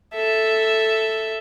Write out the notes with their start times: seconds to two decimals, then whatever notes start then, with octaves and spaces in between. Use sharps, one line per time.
0.15 A4 E5